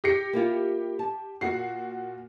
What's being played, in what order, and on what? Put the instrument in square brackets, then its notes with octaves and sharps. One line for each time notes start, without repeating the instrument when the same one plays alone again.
[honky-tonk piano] G4 A#6 C#7
[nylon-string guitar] A#3 E4 F4
A5
[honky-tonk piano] A#2 F#4 C7 [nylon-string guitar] F#5